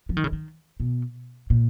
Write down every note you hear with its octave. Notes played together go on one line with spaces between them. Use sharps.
F3
D#3
C#3
D#3
B2
A#2